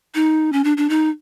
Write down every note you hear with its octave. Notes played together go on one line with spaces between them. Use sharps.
D#4
C#4
D4
D4
D#4